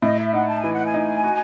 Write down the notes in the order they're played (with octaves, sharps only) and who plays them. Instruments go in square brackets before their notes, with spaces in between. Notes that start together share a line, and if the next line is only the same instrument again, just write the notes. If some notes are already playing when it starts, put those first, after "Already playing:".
[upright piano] A2 [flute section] D#5
[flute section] E5
[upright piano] D#4 [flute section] F#5
[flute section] A5
[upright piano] E3 [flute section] G#5
[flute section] F#5
G#5
[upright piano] D#4
F#4